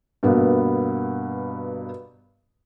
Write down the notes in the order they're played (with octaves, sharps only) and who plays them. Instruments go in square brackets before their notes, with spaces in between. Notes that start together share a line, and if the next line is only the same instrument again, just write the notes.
[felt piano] G2 B2 A#3 B3